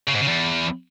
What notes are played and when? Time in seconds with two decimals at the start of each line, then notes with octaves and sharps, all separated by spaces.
0.07 C#3
0.14 G#2
0.21 C#3
0.27 E2